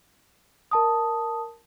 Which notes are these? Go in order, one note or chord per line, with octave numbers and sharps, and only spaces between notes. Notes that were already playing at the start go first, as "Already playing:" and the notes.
A#4 A5 D#6